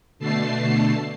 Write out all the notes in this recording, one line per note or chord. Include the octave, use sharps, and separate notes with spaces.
B2 D3 A3 A5 C7